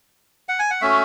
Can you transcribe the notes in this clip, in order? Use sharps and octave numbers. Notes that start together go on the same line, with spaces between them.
F#5
G#5
F#5
A3 C#4 F#4 E5